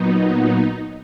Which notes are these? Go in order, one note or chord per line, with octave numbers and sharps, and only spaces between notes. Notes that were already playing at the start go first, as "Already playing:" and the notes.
Already playing: A#2 F#3 B3 D#4